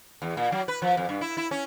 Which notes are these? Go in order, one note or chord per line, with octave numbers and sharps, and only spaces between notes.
E2
A#2
F#3
B4
F3
F2
G2
E4
E4
C#4